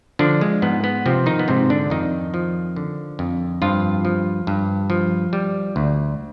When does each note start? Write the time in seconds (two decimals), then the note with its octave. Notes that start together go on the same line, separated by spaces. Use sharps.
0.19 D3 F3 D4
0.41 G#3
0.62 G#2 B3
0.84 B3
1.06 C3 F3 C4
1.26 D#3 D#4
1.39 B3
1.48 G#2 C3 C4
1.70 D3 D4
1.90 F2 D#3 D#4
2.34 F3
2.76 D3
3.19 F2
3.62 G2 F3 F4
4.05 F3
4.47 G2
4.90 F3
5.33 G3
5.76 D2